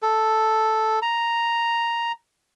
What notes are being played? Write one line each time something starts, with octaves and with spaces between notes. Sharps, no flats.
A4
A#5